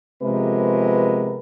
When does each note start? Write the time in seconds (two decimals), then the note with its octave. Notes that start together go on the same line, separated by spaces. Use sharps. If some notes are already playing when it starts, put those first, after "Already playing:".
0.22 C3 F3 G#3 B3 A#4 B4